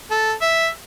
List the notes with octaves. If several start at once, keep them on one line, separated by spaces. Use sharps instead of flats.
A4
E5